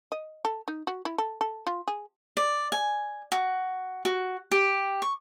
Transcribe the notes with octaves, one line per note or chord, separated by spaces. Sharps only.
D#5
A4
D#4
F#4
E4
A4
A4
F4
G#4
D5
G#5
F#4
F#4
G4
C#6